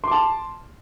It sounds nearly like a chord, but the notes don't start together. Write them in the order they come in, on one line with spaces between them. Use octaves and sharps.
C6 D6 A5